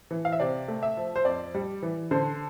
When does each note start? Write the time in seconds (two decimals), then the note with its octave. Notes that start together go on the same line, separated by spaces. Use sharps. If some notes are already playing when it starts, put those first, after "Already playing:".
0.11 E3
0.25 F5
0.32 E5
0.40 C3 D5
0.68 A3
0.83 E5
0.97 F3
1.16 C5
1.25 F2 D5
1.54 G3
1.83 E3
2.11 D3 C5